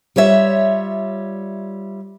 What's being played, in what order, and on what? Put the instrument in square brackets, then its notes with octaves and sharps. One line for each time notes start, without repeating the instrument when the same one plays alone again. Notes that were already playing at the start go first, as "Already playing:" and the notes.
[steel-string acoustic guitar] G3 F4 C#5 E5